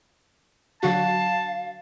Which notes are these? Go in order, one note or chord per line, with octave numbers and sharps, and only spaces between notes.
D3 F#3 F#4 F5 A5